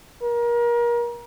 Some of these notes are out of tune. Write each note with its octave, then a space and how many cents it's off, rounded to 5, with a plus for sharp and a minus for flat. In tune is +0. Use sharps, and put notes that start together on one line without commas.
A#4 +30